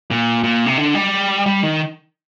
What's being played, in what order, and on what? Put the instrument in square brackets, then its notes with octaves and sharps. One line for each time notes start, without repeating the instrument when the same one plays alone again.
[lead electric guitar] A#2
A#2
C3
D3
G3
G3
D#3